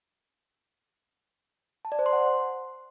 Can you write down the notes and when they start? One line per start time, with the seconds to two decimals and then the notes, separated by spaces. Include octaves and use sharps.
1.85 A5
1.92 D5
1.99 C5
2.06 C6
2.13 F#5